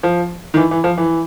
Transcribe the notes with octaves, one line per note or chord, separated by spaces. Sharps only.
F3
D#3
E3
E3
F3
E3